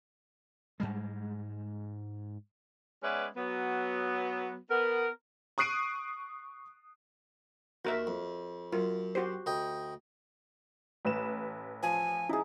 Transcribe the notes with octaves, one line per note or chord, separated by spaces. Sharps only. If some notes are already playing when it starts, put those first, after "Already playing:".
G#2 G3 G#3
G#3 B3 C#4 B4 D5 E5
F#3 B3
B3 A#4
C#6 D#6 F#6 C7 D7 D#7
D#2 F#4 A#4 E5
F2
F#2 F4
F#4 G4 C5
D2 D#5 G5
A1 B4 E7
F3 G#5
D#4 E4 G#4